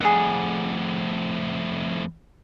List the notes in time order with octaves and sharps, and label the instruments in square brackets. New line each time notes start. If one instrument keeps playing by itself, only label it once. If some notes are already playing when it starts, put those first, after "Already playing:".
[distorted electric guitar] F2 A2 [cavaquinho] G#4 D5 F#5